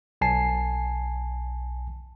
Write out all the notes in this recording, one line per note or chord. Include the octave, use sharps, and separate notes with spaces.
B1 G#5 A5 C7